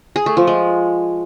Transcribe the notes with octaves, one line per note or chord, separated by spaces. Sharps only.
G#4
A3
F3
G#3